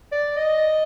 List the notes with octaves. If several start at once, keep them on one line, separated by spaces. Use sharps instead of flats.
D5
D#5